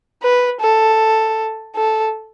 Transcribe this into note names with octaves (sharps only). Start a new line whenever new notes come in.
B4
A4
A4